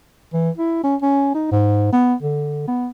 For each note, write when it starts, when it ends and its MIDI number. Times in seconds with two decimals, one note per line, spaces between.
0.33 0.50 52
0.57 0.80 64
0.84 0.96 61
1.02 1.31 61
1.34 1.49 63
1.51 1.90 44
1.92 2.14 59
2.22 2.66 50
2.68 2.88 59